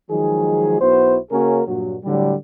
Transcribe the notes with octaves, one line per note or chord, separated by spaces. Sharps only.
D#3 F3 F#3 G#3 G#4
B1 B3 E4 F#4 C5
C#3 A#3 C#4 F#4 G#4 A#4
G2 A#2 F#3
A2 D3 F#3 G3